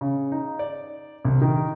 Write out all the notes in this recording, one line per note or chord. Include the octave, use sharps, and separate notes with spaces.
C#3
D#4
D5
C2
D#3